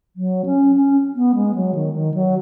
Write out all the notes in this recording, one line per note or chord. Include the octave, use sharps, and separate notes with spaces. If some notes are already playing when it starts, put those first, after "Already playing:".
F#3
C#4
C#4
B3
G#3
F#3
D#3
D#3
F#3